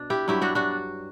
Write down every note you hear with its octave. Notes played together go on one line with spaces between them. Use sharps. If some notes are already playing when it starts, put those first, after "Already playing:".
Already playing: B2 D4
E4 G4
G2 F#3 E4 G4
D4 F#4
D4 F#4